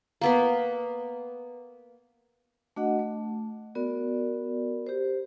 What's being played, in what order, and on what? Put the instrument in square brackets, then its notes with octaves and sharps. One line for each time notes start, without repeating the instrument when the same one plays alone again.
[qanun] A#3 B3 B4
[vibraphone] A3 D4 F#4 D#5 F#5
A3
B3 F#4 A#4 D5
G4 C5